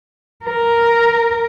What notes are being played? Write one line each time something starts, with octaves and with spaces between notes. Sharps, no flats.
A#4